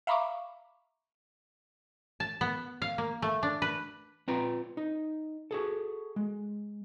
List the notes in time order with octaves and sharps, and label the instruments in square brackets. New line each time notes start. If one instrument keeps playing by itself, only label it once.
[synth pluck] E5 F5 A#5 B5 C#6 D6
[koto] A5
B3
F5
A#3
A3
D4
B4
[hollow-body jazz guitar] C4 F4 B4 G5 A#5
D#4
F#4 G#4 A4
G#3